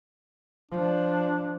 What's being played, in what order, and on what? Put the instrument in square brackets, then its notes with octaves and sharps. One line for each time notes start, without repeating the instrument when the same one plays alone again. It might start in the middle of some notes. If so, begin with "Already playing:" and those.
[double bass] F3 [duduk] D4